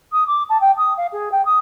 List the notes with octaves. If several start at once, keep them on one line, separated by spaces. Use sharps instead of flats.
D#6
D6
A5
G5
D#6
F5
G#4
G5
D#6